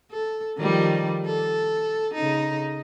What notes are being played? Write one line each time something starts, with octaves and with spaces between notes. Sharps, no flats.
A4
D#3 F3 G3
A4
C#3 D#4